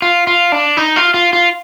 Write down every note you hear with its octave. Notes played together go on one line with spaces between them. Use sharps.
F4
F4
D4
D#4
F4
F4
F4